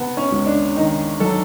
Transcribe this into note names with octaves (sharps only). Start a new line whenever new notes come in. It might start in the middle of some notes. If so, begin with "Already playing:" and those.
Already playing: C3 B3
C#4
C#2
D4
D#3 D#4
F#3 A4